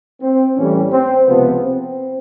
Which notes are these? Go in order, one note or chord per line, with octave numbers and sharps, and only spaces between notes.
C4
A1 A2 E3 G3 C#4
C4
C#2 C3 F3 B3
C4